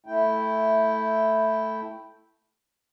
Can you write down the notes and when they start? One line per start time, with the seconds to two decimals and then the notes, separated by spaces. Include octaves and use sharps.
0.06 A3 E4 G5